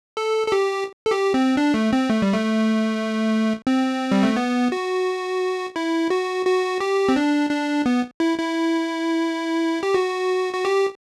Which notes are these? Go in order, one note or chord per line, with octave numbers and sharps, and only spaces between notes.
A4
A4
G4
A4
G4
C4
D4
A3
C4
A3
G3
A3
C4
G3
A3
B3
F#4
E4
F#4
F#4
G4
C4
D4
D4
B3
E4
E4
G4
F#4
F#4
G4